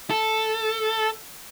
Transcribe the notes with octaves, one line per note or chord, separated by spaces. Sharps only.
A4